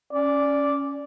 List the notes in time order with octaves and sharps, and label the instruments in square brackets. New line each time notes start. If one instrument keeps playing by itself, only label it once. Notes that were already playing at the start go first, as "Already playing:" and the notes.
[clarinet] C#4 [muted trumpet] D5